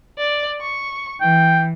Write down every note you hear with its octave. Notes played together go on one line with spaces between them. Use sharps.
D5
C#6
E3 G5